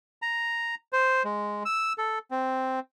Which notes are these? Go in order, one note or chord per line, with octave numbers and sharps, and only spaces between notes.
A#5
C5
G#3
E6
A4
C4